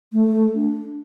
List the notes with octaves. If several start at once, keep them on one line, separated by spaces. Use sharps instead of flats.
A3
D4